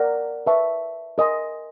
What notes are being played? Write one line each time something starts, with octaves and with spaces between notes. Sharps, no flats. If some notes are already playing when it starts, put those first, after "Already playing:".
Already playing: A#4 D5 F#5
B4 E5 A5 C#6
A#4 D#5 G#5 C6